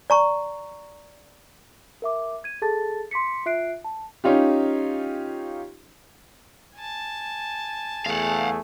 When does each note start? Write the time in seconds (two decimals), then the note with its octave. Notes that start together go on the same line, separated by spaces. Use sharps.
0.10 D5 A#5 C#6
2.02 A#4 E5 D6
2.44 G#6 D#7
2.62 G#4 A4 A5 A6
3.11 C6 D6 B6 C#7
3.46 F4 E5 F#6 C7 D7
3.84 A5
4.24 C#4 D#4 F4 G4
6.76 G#5 A5
8.06 E2 A3 G#4 F5 F#5